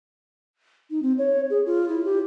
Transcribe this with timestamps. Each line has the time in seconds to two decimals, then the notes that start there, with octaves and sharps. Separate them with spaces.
0.90 D#4
1.02 C4
1.18 C#5
1.50 G#4
1.66 F4
1.89 E4
2.05 G4